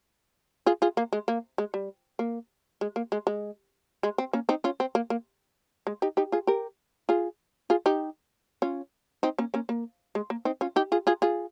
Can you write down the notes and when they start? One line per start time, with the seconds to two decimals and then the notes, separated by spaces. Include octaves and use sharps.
0.66 F4 G#4
0.82 F4 G#4
0.97 A#3
1.13 G#3
1.28 A#3
1.58 G#3
1.74 G3
2.19 A#3
2.81 G#3
2.96 A#3
3.12 G#3
3.27 G#3
4.03 G#3
4.18 C4
4.33 A#3 C#4
4.49 C4 D#4
4.64 C#4 F4
4.80 C4
4.95 A#3
5.10 A#3
5.87 G#3
6.02 D#4 G4
6.17 D#4 G4
6.32 F4 G#4
6.47 G4 A#4
7.09 F4 G#4
7.70 F4 G#4
7.86 D#4 G4
8.62 C#4 F4
9.23 C4 D#4
9.38 A#3 C#4
9.54 A#3 C#4
9.69 A#3
10.15 G#3
10.30 A#3
10.45 C4 D#4
10.61 C#4 F4
10.76 D#4 G4
10.92 F4 G#4
11.07 F4 G#4
11.22 F4 G#4